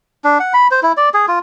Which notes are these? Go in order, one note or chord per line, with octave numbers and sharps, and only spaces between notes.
D4
F#5
B5
C5
E4
D5
G#4
F4